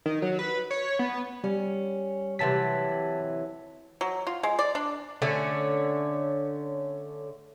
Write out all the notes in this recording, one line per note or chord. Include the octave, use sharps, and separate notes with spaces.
D#3
F#3
B4
C#5
B3
G3 C#4
C3 E3 F#3 A5 B6
F#3
F4
G#3
D5
D4
D3 A3 C#4